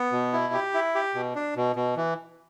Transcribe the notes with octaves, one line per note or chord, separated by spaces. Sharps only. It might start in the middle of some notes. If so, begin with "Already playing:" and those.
Already playing: B3
B2
E4
G4
E4
G4
B2
D4
B2
B2
E3